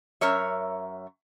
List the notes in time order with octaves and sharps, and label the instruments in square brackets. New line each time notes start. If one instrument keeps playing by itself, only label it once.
[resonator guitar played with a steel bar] F#2 A#4 C#5 E5